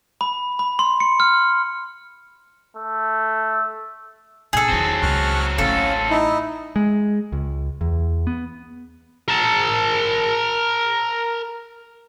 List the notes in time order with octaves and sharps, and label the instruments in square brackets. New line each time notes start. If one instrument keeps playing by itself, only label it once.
[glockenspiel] B5
B5
C6
C#7
F6
[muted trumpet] A3
[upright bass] A#1 [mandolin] G#4 A4
[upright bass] E2 D#3 [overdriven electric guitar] F#3 C4
[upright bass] C#2 [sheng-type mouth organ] C#6 F6 F#6
[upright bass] A1 A2 [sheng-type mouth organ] C#4 F5 [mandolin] A4
[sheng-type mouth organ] D#4 E4
[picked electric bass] G#3
C#2
E2
B3
[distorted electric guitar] A#4 A5